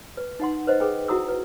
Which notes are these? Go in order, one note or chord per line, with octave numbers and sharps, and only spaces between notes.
B4
D#4 F#5 C6
B4 C5 D#5 F#5
G#4 A4 B4 G5
E4 F#4 F#5 A#5 D#6 E6
B4